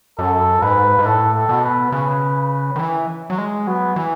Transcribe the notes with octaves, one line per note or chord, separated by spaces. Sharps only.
F#2 A4
G#2 B4
G#2
A2 A4
A4
B2
B4
C#3 B4
D#3
E3
F#3
G#3
F#3 B3
E3